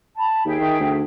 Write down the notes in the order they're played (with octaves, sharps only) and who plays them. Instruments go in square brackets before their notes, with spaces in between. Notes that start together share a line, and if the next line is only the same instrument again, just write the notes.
[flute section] A5 B5
[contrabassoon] D#2 [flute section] G#4 E5 G5
[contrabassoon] D#3
D2